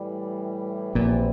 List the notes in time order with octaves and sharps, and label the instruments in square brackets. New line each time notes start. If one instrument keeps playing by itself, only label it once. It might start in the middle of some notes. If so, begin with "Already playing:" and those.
Already playing: [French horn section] A2 E3 G3
[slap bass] A#1 A#2 [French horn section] E2 E3 G3 C4 G4